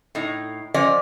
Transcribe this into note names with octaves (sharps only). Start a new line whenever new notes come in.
A2 D#4
F3 C#4 D5 D#5